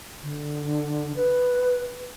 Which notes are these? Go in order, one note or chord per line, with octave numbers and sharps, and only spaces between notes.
D3
B4